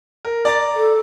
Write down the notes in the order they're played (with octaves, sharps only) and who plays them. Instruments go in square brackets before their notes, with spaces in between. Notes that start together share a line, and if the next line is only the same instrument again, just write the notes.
[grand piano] A#4
D5 A#5 A6
[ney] A4